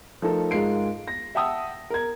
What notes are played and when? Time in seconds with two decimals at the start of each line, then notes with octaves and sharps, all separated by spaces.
0.22 F3 A3 D#4 A4 A#4
0.51 G#2 G#3 F4 A#4 C7 D7
1.08 A#6
1.35 E5 F#5 G5 A5 D#6 E6
1.90 A#4 G#6